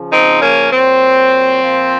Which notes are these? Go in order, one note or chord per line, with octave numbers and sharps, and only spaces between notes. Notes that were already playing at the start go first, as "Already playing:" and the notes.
Already playing: C#3 F3
C4 D#4
A#3 C#4
A#2 F#3 C4
A#2 F3